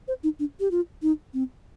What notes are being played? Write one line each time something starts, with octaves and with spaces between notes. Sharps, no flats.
C5
D#4
D4
G4
F4
D#4
C4